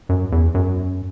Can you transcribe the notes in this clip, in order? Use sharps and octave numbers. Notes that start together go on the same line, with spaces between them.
F#2
E2
F#2